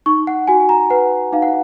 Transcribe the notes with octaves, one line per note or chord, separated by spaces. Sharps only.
D#4 C#6
F#5
F#4 G#5
A#5
B4 F#5
D#4 F5
F#5